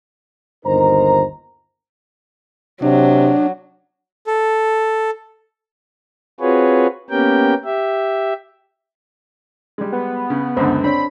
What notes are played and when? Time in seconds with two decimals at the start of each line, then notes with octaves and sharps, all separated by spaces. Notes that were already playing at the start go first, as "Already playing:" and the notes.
0.66 G1 D#2 D#4 A#4 C5 A#5
2.82 C3 F#3 D4
4.27 A4
6.40 C4 F4 F#4 G#4 B4 C#5
7.10 A#3 B3 C#4 G4 A#4 G5
7.65 G4 E5
9.78 G3 G#3
9.92 B3
10.30 C#3
10.57 C#2 F#2 D3 C5
10.84 C4 D4 C5 C#5 B5